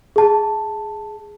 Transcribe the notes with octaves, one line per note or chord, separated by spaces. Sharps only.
G#4 A5